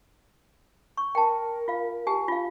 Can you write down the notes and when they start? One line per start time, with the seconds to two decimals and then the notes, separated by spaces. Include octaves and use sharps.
0.97 C#6
1.15 A#4 G5 A5
1.68 F4 F5
2.07 G4 G#5 A5
2.28 F4 F5